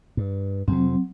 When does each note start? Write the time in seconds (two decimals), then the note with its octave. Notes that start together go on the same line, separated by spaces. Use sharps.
0.17 G2
0.68 F2 C3 F#3 C4